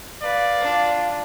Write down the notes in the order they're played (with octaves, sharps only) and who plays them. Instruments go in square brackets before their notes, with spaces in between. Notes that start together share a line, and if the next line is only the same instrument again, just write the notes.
[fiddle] B4 [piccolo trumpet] D5 [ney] F5
[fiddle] D4 F4